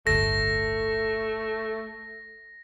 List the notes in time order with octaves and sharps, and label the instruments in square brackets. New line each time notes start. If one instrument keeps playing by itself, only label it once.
[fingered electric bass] D1 G1 [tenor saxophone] A3 [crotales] A#6